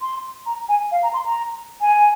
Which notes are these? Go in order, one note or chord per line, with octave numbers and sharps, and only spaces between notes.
C6
A#5
G#5
F5
A#5
C6
A#5
G#5